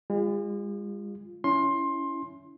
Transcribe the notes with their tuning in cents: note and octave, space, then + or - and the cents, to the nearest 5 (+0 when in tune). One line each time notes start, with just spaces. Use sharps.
G#3 -40 F4 +0
C#4 +25 E4 +10 C6 +20